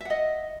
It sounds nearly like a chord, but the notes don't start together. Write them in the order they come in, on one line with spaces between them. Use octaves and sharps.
E5 F#5 D#5